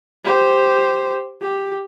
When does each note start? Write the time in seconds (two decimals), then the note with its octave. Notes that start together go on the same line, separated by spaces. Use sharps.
0.25 G4 C5
1.41 G4